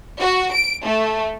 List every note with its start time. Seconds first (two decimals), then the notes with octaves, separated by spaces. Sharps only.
0.20 F#4
0.53 D7
0.84 A3